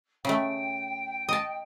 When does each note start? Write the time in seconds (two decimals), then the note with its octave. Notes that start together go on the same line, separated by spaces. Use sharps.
0.25 C#3 A3 G5
1.29 D#5 A5